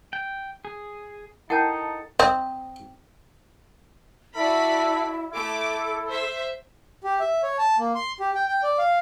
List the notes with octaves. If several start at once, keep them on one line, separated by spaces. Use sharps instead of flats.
G5
G#4
D#4 E4 A4 A#4 F#5 G5 A5 G6
C4 D#5
E4 F#4 A4 D5 E5 B5
A3 E4 A4 D6
C5 E5
G4
E5
C#5
A5
A#3
C6
G4
G5
G5
D5
F5